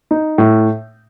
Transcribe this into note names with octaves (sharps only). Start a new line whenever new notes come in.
D#4
A2